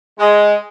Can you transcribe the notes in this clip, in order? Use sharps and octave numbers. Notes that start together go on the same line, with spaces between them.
G#3